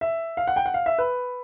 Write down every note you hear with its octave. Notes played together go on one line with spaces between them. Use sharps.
E5
F5
F#5
G5
F#5
F5
E5
B4